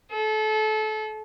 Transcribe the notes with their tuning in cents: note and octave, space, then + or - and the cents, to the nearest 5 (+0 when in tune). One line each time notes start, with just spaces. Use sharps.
A4 -30